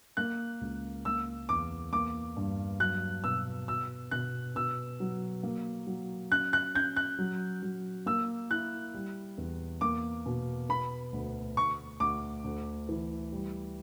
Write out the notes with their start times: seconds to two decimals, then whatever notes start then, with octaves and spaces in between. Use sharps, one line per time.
0.17 A#3 F#6
0.61 C#2
1.05 A#3 E6
1.49 E2 D6
1.92 A#3 D6
2.37 G2
2.80 F#3 F#6
3.24 B2 E6
3.68 B2 E6
4.11 B2 F#6
4.56 B2 E6
5.00 F#3
5.43 A#3
5.87 F#3
6.31 C#4 F#6
6.53 F#6
6.75 C#4 G6
6.96 F#6
7.19 F#3
7.63 F#3
8.06 A#3 E6
8.51 E4 F#6
8.94 G3
9.38 E2
9.81 A#3 D6
10.26 B2
10.69 B3 B5
11.13 D2
11.57 D2 C#6
12.00 D2 D6
12.44 D2
12.89 E3
13.32 G3